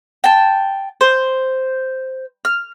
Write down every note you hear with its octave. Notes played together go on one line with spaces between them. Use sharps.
G5 A5
C5
F6